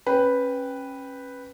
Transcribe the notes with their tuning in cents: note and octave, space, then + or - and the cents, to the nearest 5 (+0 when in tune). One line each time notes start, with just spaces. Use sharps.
C#4 -20 B4 +0 G5 +0